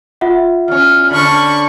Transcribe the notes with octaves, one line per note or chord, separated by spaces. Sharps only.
F4 E5 F#5
E2 C#4 F6
D3 D4 B5 C#6